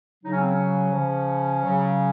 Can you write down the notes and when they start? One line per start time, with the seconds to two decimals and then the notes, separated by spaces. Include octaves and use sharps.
0.24 C#3 F#3 D#4
0.32 C#4
0.39 C4
0.46 C#4
0.92 C#3 F3
1.61 C#3 F#3